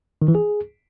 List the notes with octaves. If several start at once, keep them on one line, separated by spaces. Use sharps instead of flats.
D#3
E3
G#4